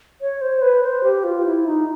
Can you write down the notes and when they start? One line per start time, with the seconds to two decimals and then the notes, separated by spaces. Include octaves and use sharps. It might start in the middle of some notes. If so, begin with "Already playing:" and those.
0.21 C#5
0.41 C5
0.62 B4
0.83 C5
1.04 G4
1.24 F4
1.45 E4
1.66 D#4